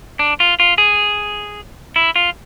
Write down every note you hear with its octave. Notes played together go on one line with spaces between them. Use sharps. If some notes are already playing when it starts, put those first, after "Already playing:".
D4
F4
F4
G#4
E4
F4